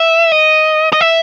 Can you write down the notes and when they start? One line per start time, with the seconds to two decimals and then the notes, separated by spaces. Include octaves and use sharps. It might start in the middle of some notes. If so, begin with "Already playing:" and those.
Already playing: E5
0.32 D#5
0.93 D#5
1.01 E5